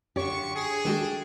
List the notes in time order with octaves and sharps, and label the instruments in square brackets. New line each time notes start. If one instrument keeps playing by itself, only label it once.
[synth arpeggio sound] F#2 C#5 [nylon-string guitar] D3 G4 [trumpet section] F4 C#6
[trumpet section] G#4
[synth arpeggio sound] D#3 G#3 F#4 [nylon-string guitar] D4 A4 G5